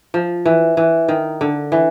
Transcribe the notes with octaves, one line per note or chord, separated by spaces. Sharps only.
F3
E3
E3
D#3
D3
E3